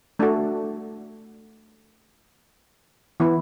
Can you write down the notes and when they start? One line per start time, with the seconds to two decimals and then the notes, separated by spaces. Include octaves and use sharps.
0.19 A3 D4 F#4 A4
3.20 E3 B3 E4 B4